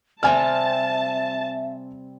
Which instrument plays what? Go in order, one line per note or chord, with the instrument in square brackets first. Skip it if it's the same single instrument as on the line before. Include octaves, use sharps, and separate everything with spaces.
[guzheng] C3 G3 C4 [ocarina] E5 [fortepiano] G#5 F6 [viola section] A5